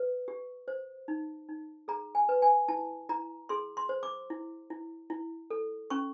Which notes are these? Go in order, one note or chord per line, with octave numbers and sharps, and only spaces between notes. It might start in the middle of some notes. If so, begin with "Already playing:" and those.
Already playing: B4
G4
C5
D#4
D#4
G#4 A#5
G#5
B4
G#5
E4 A5
E4 A#5
G#4 C6
C6
C5
D6
E4
E4
E4
A4
C#4 C#6